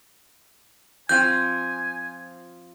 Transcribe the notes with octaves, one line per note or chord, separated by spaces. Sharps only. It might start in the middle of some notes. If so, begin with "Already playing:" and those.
F3 C4 F4 G#5 G6